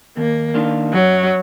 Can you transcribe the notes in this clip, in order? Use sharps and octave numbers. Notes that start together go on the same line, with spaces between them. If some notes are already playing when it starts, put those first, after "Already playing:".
D#2 A#3
D#3 A#3 D4 F4
F#2 F#3